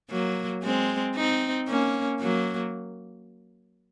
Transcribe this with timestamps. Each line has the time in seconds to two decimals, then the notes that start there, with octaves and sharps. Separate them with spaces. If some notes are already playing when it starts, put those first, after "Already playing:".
0.10 F#3 A#3
0.63 G#3 C4
1.15 C4 D#4
1.68 A#3 C#4
2.20 F#3 A#3